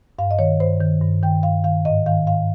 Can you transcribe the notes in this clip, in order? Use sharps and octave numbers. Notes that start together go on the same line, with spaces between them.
G2 F5
D#5
D#3 C#5
G2 C5
D#3
G2
D#3 G5
G2 F5
D#3 F5
G#2 D#5
D#3 F5
G#2 F5